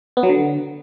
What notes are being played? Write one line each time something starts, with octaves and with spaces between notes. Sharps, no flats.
B3
F#3
D3